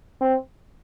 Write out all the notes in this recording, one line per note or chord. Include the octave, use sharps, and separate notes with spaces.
C4